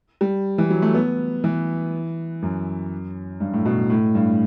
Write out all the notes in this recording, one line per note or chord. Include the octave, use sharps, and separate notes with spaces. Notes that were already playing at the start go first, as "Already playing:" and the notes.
G3
E3
F#3
A3
B3
E3
F#2
G2
A2
B2
A2
G2